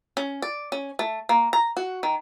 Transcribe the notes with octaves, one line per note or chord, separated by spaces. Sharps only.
C#4
D5
C#4
A3
A#3
A#5
F#4
D#3